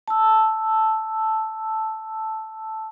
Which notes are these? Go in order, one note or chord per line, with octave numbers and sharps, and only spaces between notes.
A5 E6